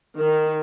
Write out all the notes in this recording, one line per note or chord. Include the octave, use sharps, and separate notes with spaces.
D#3